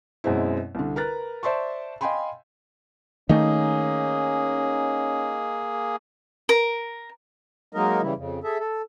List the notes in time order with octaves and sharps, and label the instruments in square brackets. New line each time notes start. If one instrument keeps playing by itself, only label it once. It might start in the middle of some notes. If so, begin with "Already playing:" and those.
[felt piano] F#2 B2 G#3 C4 E4
C2 D3
A#4 B4 A#5 F#6 A6
C5 D5 E5 A5 C6 C#6
D#5 F5 G5 G#5 B5 C6
[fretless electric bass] D#3 A3 [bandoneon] A#3 G#4 [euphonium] C#4 [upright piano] D#4
[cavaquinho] A#4
[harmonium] F#3 G#3 A#3 D#4 A#4 D#5
C#3 E3 G3 E4
F2 C#3
G#4 A4 E5
A4